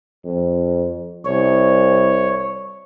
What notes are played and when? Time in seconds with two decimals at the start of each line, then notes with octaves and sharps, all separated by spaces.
0.25 F2
1.25 C2 C#5